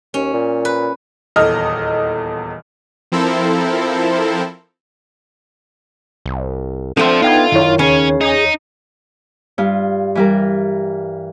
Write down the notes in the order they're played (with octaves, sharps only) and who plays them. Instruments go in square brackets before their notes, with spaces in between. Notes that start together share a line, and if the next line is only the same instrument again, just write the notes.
[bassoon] D#2 [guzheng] C#4
[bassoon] A#2
[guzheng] B4
[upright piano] D#1 E2 A4 D#5 F6
[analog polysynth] F3 C4 E4 A4 A#4 C5
[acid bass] C2
[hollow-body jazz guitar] D3 A3 [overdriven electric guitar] F3 C5 [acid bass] C4
[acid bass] B3 [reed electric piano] D#4 G5 G#6 [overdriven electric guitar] F4
[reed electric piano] F#2 E4 C#5 [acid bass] D#3
[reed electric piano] D#2 C#5 [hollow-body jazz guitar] C#3 [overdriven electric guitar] C#4
[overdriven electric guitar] D#4 [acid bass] G#4
[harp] G2 F4
E3 G3 A#4